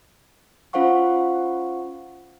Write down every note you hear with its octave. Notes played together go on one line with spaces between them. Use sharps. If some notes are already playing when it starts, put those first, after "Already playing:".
C#4 F4 C5 F5 F#5 C#6